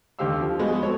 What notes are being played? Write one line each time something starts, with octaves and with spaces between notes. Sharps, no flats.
D#2 D3 G4 C5 F5 E6
F3
G#3 B3 F#4 D#5
C4 A4 C#5